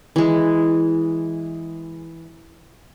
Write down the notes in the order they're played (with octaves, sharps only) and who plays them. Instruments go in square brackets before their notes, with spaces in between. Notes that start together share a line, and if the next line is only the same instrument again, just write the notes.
[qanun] E3 G#3